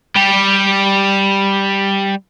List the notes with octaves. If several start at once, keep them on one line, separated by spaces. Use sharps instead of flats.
G3 G4